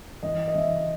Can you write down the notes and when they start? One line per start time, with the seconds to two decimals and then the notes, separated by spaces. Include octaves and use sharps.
0.23 E3 D#5
0.48 D#5
0.55 E3 E5